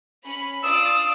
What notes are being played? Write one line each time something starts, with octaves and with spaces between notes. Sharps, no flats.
C#4 B5
D4 F4 D5 D#6 E6